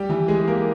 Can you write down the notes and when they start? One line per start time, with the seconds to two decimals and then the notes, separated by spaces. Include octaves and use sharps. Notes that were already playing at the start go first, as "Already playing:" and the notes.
Already playing: G3 G4
0.09 E3 E4
0.28 G#3 G#4
0.47 A#3 A#4